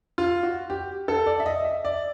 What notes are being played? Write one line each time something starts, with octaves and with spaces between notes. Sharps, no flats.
F4
F#4
G4
A4
D5
E5
D#5
E5
D5